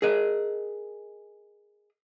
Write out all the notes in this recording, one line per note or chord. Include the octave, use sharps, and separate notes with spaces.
G#4 A#4 D#5